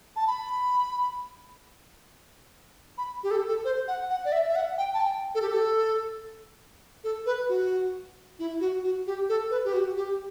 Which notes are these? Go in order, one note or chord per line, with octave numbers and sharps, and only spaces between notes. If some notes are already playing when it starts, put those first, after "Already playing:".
A5
B5
B5
G4
A4
A4
C5
F#5
F#5
D5
E5
E5
F#5
G5
A5
G5
A4
G4
A4
A4
B4
F#4
E4
F#4
F#4
G4
A4
B4
G4
F#4
G4